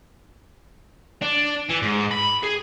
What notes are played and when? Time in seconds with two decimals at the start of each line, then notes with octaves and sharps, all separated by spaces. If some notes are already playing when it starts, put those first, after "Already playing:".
1.22 D4
1.69 E3
1.82 G#2
2.11 B5
2.44 G#4